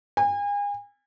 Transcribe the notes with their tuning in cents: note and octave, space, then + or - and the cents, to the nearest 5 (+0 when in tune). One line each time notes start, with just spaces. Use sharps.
G#5 -35